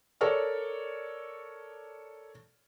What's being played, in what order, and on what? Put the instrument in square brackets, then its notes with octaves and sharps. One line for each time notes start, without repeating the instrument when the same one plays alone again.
[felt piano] A4 A#4 C#5 D5 C#6 F6